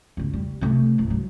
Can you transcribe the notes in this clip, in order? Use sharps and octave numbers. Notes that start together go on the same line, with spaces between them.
E2 C#3
G3
C3 A3
C2 G2
F#3 B3